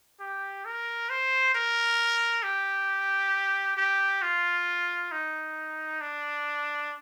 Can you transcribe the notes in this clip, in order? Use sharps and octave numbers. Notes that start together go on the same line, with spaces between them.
G4
A#4
C5
A#4
G4
G4
F4
D#4
D4